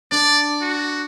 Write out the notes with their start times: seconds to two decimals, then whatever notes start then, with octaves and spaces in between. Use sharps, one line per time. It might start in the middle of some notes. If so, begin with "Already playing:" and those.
0.12 D4 D5
0.61 F#4